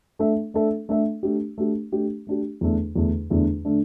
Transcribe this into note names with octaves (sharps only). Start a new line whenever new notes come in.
A3 D4 A4 E5
A3 D4 A4 E5
A3 D4 A4 E5
A3 D4 G4
A3 D4 G4
A3 D4 G4
A3 D4 G4
E2 D3 A3 D4
E2 D3 A3 D4
E2 D3 A3 D4
D3 A3 D4